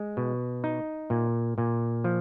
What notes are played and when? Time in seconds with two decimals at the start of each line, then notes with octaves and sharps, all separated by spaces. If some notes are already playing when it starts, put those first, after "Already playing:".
Already playing: G#3
0.17 B2
0.64 D#4
1.10 A#2
1.58 A#2
2.04 F3